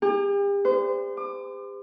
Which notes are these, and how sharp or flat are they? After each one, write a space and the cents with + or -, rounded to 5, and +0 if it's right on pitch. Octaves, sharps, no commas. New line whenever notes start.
G4 +40
C5 -35
D6 +35